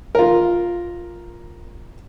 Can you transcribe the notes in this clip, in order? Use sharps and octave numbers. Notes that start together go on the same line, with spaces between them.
F4 A#4